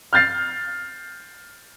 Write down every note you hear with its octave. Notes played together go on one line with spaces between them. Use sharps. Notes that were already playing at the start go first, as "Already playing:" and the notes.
F6 G6 A6 C7